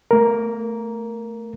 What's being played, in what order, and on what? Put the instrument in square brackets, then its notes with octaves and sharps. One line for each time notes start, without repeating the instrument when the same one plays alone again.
[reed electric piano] A3 A#4